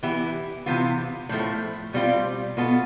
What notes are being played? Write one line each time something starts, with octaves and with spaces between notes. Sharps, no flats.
E3 B3 E4 G4
C3 E3 B3 F4
A2 F3 A3
B2 G3 C4 F4
B2 B3 F4 A4